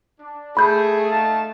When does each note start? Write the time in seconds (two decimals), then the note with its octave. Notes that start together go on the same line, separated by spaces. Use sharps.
0.20 D4
0.57 A3 G#4 B5 G6
1.10 D#4 F5 A5